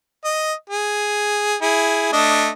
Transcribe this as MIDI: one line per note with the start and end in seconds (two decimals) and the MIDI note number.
0.24 0.53 75
0.69 1.56 68
1.62 2.08 64
1.62 2.08 68
2.13 2.50 57
2.13 2.50 62
2.13 2.50 75